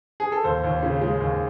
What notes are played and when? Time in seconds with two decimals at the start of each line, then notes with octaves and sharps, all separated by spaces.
0.20 G#4
0.32 A4
0.44 D#2 C5
0.64 D#2
0.83 C#3
1.01 G#3
1.21 D#2